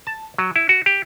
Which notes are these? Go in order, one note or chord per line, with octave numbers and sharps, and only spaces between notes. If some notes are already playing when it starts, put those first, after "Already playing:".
A5
F#3
E4
F#4
G4